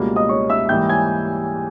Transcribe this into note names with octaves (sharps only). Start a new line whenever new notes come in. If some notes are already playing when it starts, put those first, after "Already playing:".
Already playing: C#2 B2 G3 A#3
D#5 D#6
C#5 C#6
E5 E6
G#2 E3 G3 A#3 G5 G6
G#5 G#6